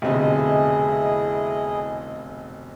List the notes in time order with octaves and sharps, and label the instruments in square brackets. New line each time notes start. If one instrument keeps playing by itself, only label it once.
[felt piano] F1 B1 C4 [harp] D3 D#6 [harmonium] E4 G#4 D#5